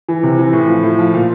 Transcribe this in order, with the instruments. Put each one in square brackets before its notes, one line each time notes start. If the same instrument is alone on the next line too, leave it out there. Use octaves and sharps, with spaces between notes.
[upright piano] E3
C3
E3
A2
F3
A2
F3
A#2